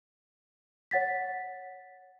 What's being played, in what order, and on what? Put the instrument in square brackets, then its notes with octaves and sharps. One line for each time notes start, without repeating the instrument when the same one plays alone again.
[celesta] C#5 F#5 A6 B6